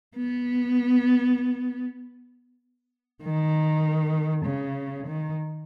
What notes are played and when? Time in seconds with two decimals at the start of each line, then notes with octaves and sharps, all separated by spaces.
0.17 B3
3.24 D#3
4.45 C#3
5.07 D#3